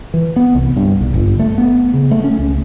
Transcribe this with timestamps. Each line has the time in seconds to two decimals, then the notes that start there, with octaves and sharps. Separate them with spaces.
0.14 E3
0.36 B3
0.55 C2
0.77 G2
1.01 B1
1.14 G1
1.40 A3
1.58 B3
1.94 C#3
2.11 A3
2.24 C#4
2.39 C#2